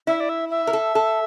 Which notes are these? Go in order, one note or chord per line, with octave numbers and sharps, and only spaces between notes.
E4 E5
D5
E5
E5
A#4
A4
A4